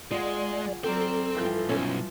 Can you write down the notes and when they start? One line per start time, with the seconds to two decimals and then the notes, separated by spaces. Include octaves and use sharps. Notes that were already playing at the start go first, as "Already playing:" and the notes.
0.11 G#3 F4 G#4 D5 F#5
0.84 F#3 C4 A4 A#4 D5 G5
1.34 G2 E3 F3
1.69 B1 C#4